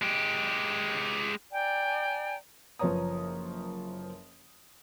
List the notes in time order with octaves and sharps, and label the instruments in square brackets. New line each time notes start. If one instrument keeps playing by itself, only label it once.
[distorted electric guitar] G#3 G4
[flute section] D5 G5 G#5 A#5
[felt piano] F#1 F3 B4 C#5 A#5 D#6